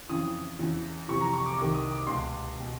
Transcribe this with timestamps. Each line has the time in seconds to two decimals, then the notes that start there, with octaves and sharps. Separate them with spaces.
0.09 F2 C#3 E3 D#6
0.59 E2 C#3 E3
1.08 F2 C3 E3 C#6
1.21 A#5
1.33 C#6
1.46 D6
1.57 C2 C3 D#3 D6
1.74 D#6
1.91 D6
2.07 C#2 B2 C6
2.59 B2